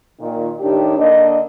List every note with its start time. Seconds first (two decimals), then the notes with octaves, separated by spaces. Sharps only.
0.20 A#2 D#3
0.60 A2 D#3 D4 D#4 G4
0.97 D3 A#3 D4 D#5